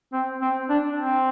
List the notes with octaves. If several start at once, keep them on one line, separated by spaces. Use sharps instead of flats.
C4
C4
D4
C4